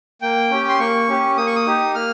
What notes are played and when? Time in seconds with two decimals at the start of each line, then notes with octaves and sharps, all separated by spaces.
0.22 A#3 G5
0.51 C#4 G4
0.68 C6
0.79 A#3 C#6
1.08 C#4 G4
1.37 A#3 D#6
1.47 C#6
1.56 D#6
1.67 D#4 G4
1.95 A#3 F6